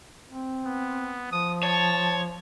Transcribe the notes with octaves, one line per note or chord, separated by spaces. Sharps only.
C4
B3
F3 D#6
C#5 A5